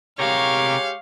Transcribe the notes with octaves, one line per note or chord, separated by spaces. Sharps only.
C3 G#3 G4 A#4 C#5 F5